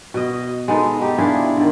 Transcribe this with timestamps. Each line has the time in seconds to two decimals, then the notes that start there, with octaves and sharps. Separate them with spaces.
0.14 B2 D#5
0.68 G#3 B3 D#4 A4
1.02 D#4 G4
1.18 D4 E4 F4 G#4
1.57 D3 D#3